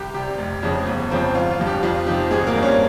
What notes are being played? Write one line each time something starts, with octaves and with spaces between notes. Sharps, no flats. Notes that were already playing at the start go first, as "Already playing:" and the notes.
Already playing: C2 G4
C3 G3 G4
F1
F2 C#3 F3 G#3
G1
F2 C#3 F3 C4
G#1 F4
F4
G2 F3
G4
F2 F4
C3 F3 C4 D#4 G4
G#1 G#3 G#4
A#3 A#4
G2 G3 C4
C#4 C#5